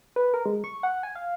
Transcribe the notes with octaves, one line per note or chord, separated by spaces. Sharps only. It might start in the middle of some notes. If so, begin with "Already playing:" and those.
B4
A#4
G#3
C#6
F#5
G#5
F5